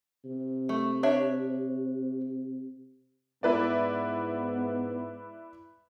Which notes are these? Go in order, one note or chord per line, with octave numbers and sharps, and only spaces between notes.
C3
A3
D4 C#5 E5
G#2 B3 E4 B4 D5